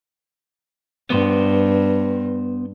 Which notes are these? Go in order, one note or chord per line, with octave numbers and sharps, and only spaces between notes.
G2 B3 C5